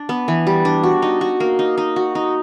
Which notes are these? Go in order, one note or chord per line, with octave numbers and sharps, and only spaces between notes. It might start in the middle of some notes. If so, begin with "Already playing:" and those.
Already playing: D4
B3
E3
G3
D4
F#4
D#4
F#4
A#3
D#4
D#4
F#4
D#4